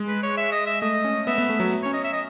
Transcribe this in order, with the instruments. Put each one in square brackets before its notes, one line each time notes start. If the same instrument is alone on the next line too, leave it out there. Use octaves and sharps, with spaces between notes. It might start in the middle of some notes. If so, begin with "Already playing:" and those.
Already playing: [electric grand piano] G#3
[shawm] B4
C#5
E5
D#5
E5
[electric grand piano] A3 [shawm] D#5
[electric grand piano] C#4
[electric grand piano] B3 [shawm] E5
[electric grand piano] B3
A3
F#3
[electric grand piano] C#4 [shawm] C#5
[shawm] D#5
E5
D#5